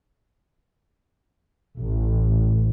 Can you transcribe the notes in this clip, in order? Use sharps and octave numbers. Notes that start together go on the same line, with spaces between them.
A1